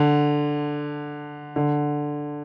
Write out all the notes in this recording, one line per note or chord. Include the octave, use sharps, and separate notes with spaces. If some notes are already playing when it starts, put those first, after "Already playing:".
Already playing: D3
D3